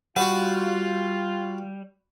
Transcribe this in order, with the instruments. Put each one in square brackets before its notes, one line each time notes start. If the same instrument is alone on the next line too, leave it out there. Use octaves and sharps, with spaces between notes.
[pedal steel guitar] G3 [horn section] F4 [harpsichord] F#4 B4 [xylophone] F#5